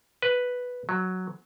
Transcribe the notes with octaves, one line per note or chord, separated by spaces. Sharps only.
B4
F#3